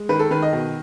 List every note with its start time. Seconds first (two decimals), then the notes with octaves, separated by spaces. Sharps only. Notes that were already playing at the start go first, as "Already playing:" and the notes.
Already playing: G#3
0.09 D#3 B4
0.19 A4
0.31 D#3 B4
0.42 D#5
0.53 B2